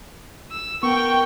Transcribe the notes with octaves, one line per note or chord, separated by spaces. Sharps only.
E6
B3 A#4 G5 C#6